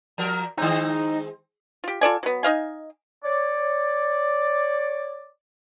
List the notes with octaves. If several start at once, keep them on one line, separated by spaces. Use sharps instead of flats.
F3 A#4
D#3 G#3 C4 D#4
F4 G4
F4 A4 D5 G#5
F#3 B3
D#4 D#5 F5 G#5
C#5 D5